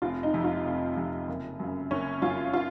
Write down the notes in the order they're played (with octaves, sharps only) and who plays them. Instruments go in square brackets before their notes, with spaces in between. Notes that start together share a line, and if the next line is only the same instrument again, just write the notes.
[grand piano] F1 [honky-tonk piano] F4
[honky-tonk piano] D#4
[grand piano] F2 C3
[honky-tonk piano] F4
[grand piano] F1
F2 C3
F#1
F#2 C#3
[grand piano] F#1 [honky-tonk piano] C#4
[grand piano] F#2 C#3 [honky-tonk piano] F4
[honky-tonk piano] F4